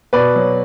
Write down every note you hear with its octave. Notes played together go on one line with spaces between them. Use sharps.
B2 B4 D5
F#3